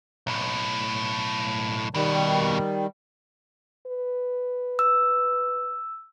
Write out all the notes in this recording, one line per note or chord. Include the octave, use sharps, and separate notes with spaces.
B1 A2
D#2 B2 D#3 G3
B4
E6